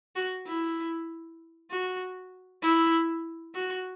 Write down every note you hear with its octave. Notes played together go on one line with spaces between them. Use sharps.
F#4
E4
F#4
E4
F#4